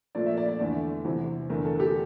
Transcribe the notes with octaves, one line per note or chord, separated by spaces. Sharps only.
A#2 F3 A3 D5
E5
D5
D5
E2 D3 A3
E2 C3 E3
E2 D3 A3 A#4
A4
A4
G4